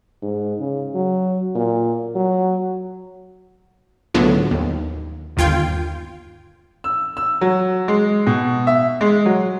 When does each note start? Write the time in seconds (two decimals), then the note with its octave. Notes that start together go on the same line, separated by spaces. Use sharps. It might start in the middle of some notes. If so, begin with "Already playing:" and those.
0.23 G#2
0.60 C#3
0.95 F#3
1.55 A#2
2.16 F#3
4.14 C#2 A2 D3 F3 F#3 B3
4.51 D#2
5.37 G1 D#2 F4 G5 G#6
6.84 E6
7.17 E6
7.41 F#3
7.88 G#3
8.26 B2
8.67 E5
9.01 G#3
9.26 F#3